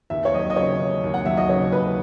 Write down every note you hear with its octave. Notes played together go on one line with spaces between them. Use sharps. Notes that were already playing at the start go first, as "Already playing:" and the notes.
D#2 E5
C#5
F#3 D#5
D#5
C#3 C#5
D#2
D#2
F#5
F#3 E5
D#5
C#3 C#5
D#2 B4